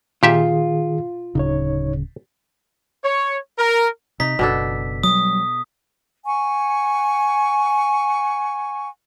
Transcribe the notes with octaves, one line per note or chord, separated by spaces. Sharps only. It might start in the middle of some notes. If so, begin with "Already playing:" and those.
A#2 D#3 F4 G4 G#4 E5
D1 C#3 D#4 C#5
C#5
A#4
C3 D#4 B6
F#1 B2 D4 A4
F#3 G3 D#6
F#5 G#5 C#6